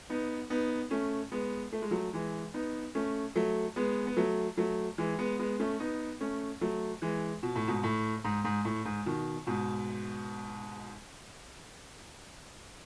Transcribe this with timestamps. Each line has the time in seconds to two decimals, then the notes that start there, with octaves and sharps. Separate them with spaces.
0.10 B3 D#4
0.50 B3 D#4
0.91 A3 C#4
1.32 G#3 B3
1.72 A3
1.82 G#3
1.91 F#3 A3
2.13 E3 G#3
2.54 B3 D#4
2.95 A3 C#4
3.35 F#3 A3
3.76 G#3 B3
4.07 B3
4.17 F#3 A3
4.57 F#3 A3
4.98 E3 G#3
5.19 G#3 B3
5.39 G#3 B3
5.59 A3 C#4
5.80 B3 D#4
6.21 A3 C#4
6.61 F#3 A3
7.02 E3 G#3
7.43 B2
7.56 A2
7.68 G#2 B2
7.83 A2
8.24 G#2
8.44 G#2
8.65 A2
8.85 G#2
9.06 B2 D#3
9.47 G#2 B2